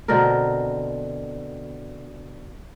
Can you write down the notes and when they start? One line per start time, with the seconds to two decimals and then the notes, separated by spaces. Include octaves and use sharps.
0.08 B2 D3 C4 A#4